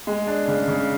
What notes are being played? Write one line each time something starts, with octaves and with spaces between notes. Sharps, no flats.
G#3
D4
C#3
C#3